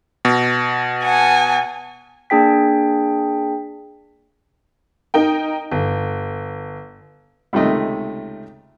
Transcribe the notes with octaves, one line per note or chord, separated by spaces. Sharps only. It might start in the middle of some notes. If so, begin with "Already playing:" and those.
B2
F#5 G#5 A5
A#3 D4 G#4 G5 B6
D#4 A#4 G5
G1
C#2 C3 D#3 A3 D#5